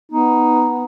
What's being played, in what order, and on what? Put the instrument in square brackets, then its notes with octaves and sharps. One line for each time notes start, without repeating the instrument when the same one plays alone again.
[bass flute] B3 [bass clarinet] D#4